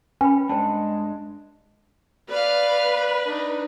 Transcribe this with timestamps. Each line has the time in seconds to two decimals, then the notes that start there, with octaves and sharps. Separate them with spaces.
0.21 C#4 B4 G5 B5
0.49 G2 G#3 D4 C5 G5 A5
2.29 B4 D5 F5
3.24 D4 D#4